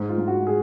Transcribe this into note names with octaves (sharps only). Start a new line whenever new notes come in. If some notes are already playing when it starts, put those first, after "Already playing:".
Already playing: G#2
F4
G#2
F#4
G#4